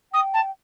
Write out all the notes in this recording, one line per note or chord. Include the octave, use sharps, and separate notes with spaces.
G5 D#6
A5